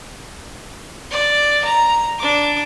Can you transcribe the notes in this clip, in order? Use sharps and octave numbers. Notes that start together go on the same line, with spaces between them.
D5
A#5
D4 D6